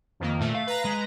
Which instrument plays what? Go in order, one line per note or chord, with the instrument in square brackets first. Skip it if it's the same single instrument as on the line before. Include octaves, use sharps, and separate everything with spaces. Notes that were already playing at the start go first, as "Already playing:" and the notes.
[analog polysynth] F2 D#3 A#3
[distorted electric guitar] A#2 [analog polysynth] A3
[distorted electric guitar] F5
[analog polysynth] B4 A#5
[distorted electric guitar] G#3